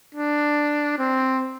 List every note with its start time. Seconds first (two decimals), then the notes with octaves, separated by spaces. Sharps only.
0.14 D4
0.98 C4